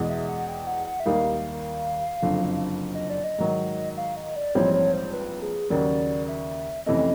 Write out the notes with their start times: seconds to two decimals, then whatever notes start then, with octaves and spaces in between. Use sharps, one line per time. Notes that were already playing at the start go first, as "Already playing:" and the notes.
Already playing: E2 B2 G#3
0.09 E5
0.28 F#5
0.48 G5
0.67 F#5
0.87 F#5
1.00 E5
1.06 D#2 D#3 G3 A#3 D#4 F5
2.22 F#1 F2 D3 F3
2.95 D#5
3.10 D5
3.24 D#5
3.38 G#2 D#3 F#3
3.97 F5
4.16 D#5
4.36 D5
4.55 A#1 G#2 E3 G3 C4 C#5
4.74 C#5
4.93 C5
5.13 B4
5.42 G#4
5.70 D#2 C#3 F#3 A#3 D5
6.28 E5
6.86 F2 C3 E3 A3 C#4 D#5